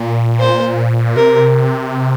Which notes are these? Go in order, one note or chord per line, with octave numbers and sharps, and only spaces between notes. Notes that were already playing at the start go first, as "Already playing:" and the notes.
Already playing: A#2
C5
C3 A#4